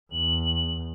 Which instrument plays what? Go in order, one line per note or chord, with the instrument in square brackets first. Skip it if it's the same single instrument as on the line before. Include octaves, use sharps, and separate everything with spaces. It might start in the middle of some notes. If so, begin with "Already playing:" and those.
[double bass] E2 [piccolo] F#7